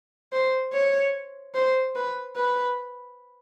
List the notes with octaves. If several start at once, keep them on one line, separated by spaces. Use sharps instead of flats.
C5
C#5
C5
B4
B4